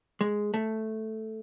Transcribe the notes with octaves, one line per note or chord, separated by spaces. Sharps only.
G#3
A3